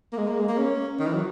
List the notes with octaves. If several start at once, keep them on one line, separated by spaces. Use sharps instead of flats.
A#3
G#3
A#3
G#3
A#3
C#4
D#3
E3
F#3